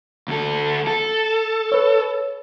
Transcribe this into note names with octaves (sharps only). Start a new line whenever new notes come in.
D2 A4
A4 A5
B4 C#5 E6